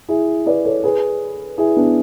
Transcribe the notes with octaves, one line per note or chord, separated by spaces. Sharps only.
E4 G#4
B4 D5
A4 C#5
G#4 B4
E4 G#4
B3 D4